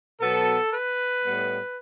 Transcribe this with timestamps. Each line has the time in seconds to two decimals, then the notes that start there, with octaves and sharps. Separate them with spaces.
0.21 B2 F#3 B3 A4
0.73 B4
1.24 A2 G3 B3